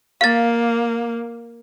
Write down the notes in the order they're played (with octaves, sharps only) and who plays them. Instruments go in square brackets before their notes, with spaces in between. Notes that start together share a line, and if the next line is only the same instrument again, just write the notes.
[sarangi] A#3 [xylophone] F5 A6